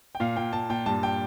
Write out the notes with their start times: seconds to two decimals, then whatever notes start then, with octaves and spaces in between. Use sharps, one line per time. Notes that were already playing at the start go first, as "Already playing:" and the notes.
0.15 G5
0.20 A#2 F5
0.36 A#2 G5
0.53 A#2 A5
0.70 A#2 G5
0.86 G2 A5
1.03 G5